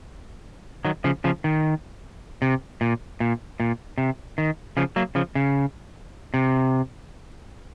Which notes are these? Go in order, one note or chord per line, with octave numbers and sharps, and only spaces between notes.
D#3 F#3
C#3 F3
C#3 F3
D#3
C3
A#2
A#2
A#2
C3
D#3
C#3 F3
F#3 A#3
C#3 F3
C#3
C3